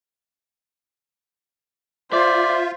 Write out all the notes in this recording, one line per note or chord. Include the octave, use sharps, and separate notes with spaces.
F4 C5 D5 E5